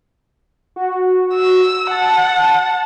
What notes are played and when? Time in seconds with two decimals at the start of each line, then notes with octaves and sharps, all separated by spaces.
0.76 F#4
1.34 E6
1.91 F#5 A5